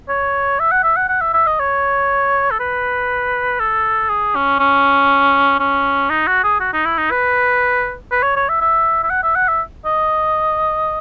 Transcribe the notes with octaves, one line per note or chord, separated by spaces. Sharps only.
C#5
E5
F#5
E5
F#5
F#5
E5
E5
D#5
C#5
A4
B4
A4
G#4
C#4
C#4
C#4
D#4
F#4
G#4
F#4
D#4
E4
D#4
B4
B4
C#5
C#5
E5
E5
E5
F#5
E5
F#5
E5
D#5